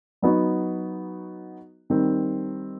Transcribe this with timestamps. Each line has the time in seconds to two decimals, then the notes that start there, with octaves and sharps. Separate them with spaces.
0.22 F#3 B3 D#4 F#4
1.90 D#3 G3 C4